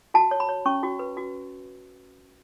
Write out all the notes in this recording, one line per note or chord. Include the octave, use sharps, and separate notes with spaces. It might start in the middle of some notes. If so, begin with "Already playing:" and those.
F#4 A5
C#5
B5
C#5
C#4 C#6
F#4
B4
F#4